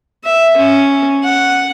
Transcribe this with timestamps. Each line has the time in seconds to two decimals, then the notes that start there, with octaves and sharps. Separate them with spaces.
0.24 E5
0.57 C#4
1.24 F#5